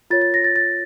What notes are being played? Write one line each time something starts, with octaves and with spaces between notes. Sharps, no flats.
F4 A#4 C#5 A6
A6
A#6
A6
A6